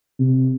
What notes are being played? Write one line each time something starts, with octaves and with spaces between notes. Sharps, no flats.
C3